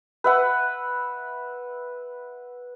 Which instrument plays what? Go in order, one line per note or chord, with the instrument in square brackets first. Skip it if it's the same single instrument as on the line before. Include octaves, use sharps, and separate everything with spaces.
[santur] B4 E5 F#5